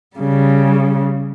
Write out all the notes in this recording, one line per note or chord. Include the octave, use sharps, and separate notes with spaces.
C#3 G3